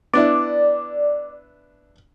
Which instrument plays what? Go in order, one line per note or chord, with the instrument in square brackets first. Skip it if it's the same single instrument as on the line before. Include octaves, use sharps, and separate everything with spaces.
[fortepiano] B3 D4 E4 [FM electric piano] D5